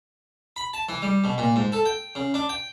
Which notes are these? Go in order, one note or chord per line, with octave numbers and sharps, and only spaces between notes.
B5
A5
E3
G3
B2
A#2
G#2
A4
G5
C#3
D4
G5